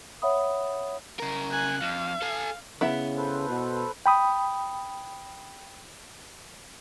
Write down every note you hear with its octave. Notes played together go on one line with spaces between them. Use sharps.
C#5 E5 F#5 B5 D#6
C#3 A#4
G#5 F#6
F2 F5
A4 G#5
C#3 B3 E4 E5
A4 B4 C5
B2
G5 B5 D#6